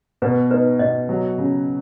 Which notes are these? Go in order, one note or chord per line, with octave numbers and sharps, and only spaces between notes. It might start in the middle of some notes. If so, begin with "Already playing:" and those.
B2 B4
D#4 B4
B2 D#5
F#3
C#3